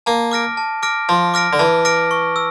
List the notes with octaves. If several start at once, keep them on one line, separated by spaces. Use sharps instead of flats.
A#3 A5
D6 F6 A#6 D7
A5
D6 F6 A#6 D7
F3 A5
D6 F6 A#6 D7
D3
E3 A5
D6 F6 A#6 D7
C#6
E6